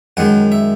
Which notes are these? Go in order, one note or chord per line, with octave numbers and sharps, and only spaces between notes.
F#2 D#3 G#3 F#5
E5